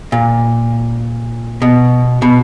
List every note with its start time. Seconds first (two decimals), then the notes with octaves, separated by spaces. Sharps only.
0.12 A#2
1.62 B2
2.22 B2